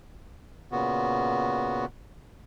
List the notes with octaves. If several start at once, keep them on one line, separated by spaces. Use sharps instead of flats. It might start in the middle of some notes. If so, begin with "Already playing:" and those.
A#2 C#3 B3 F#4